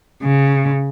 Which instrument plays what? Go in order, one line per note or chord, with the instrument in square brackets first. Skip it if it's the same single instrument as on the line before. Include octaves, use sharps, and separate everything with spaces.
[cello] C#3